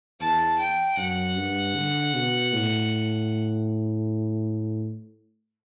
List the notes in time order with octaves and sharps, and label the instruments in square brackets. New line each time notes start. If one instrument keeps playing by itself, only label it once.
[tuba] E2 [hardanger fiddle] A5
[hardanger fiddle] G5
[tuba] F#2 [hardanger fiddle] F#5
[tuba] G2
D3
B2
A2